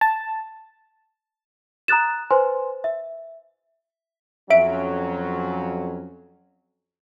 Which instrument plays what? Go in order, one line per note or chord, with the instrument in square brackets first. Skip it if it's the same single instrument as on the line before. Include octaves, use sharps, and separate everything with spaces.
[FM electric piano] A5
[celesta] A#5 D#6 F#6 A6 E7
B4 C5 G#5 C6
E5
[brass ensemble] F2 F#3 C#4 [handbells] E5 D7